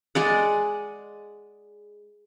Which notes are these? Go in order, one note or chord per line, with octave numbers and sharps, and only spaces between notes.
G#3 D5 F#5